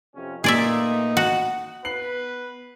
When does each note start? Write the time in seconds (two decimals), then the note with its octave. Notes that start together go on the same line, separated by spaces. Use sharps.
0.15 F2 C3 C#4
0.44 A#2 A3 B3 D#4 G#4 D5 E5
1.17 F#4 F#5
1.85 B3 B4 C7 F#7